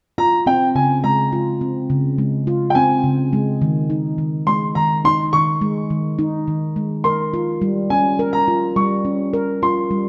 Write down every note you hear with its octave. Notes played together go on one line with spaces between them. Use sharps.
F4 A#5
C4 G5
C#3 G#5
G#3 A#5
F4
C4
C#3
G#3
F4
G5
C4 G#5
C#3
G#3
D#3
D#4
D#3
G#3 C6
D#3 A#5
D#4 C6
D#3 C#6
G#3
D#3
D#4
D#3
G#3
A#4 C6
F4
G3
C#4 G#5
A#4
A#5
F4
G3 C#6
C#4
A#4
F4 C6
G3